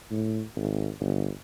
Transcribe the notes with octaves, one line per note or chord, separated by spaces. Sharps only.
A2
G#1
G1